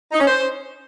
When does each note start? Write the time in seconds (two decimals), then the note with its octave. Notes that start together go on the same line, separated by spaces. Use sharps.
0.12 D#4
0.20 C#4
0.27 C5